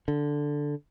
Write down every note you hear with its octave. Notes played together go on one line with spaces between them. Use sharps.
D3